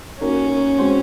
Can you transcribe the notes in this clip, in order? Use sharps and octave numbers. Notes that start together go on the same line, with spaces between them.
A#3 C#4 D#4 F#4 A#4
G#3 C4 F#4 C5